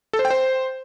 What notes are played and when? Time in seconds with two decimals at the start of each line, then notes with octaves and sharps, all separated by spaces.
0.13 A4
0.19 C5
0.25 G5
0.30 C5